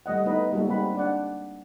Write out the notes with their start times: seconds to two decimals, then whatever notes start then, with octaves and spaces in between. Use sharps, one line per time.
0.06 G3 A3 D#5 F#5
0.26 A3 B3 D#4 B4 D#5
0.52 G3 G#3 A#3 D#4 F#4 A4
0.67 G3 C4 D#4 F#5 B5
0.95 D4 D5 F#5